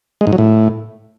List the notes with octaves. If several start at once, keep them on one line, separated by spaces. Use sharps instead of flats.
G#3
G#2
F#3
A2